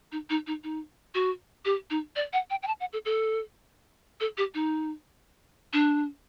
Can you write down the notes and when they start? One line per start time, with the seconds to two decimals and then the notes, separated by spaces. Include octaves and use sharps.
0.12 D#4
0.30 D#4
0.47 D#4
0.64 D#4
1.14 F#4
1.65 G4
1.90 D#4
2.16 D5
2.33 F#5
2.50 G5
2.63 G5
2.67 A5
2.80 F#5
2.93 A4
3.05 A4
4.20 A4
4.38 G4
4.54 D#4
5.73 D4